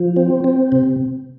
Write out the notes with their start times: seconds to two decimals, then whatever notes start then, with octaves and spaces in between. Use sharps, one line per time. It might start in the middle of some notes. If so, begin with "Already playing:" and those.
Already playing: F3
0.16 C4
0.44 C4
0.72 C3